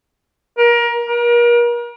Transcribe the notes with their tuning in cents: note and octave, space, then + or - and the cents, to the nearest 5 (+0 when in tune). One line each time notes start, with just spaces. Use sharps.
A#4 +25
A#4 +40